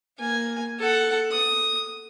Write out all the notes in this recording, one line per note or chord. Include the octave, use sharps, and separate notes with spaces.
A#3 G#5
A4 F#5
D#6